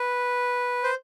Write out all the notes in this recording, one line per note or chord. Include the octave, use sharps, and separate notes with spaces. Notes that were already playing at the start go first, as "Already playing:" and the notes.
Already playing: B4
C5